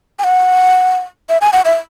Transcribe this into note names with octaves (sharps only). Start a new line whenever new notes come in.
G#5
F#5
E5
G#5
F#5
E5